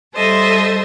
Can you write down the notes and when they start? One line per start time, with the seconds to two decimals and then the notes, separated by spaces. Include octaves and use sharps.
0.14 G3 A4 C5 D#5 E5